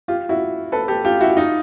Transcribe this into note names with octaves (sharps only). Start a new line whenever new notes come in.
F4 G4
E4 F#4
A4 B4
G4 A4
F4 G4
E4 F#4
D#4 F4